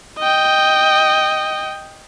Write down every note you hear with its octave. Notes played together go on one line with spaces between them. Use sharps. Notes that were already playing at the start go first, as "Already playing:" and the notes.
D#5 G5